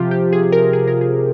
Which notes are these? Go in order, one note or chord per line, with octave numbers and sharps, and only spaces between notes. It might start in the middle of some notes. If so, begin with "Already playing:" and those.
Already playing: C3 F3 F4 G4
G4
G#4
A#4
G#4
A#4
G#4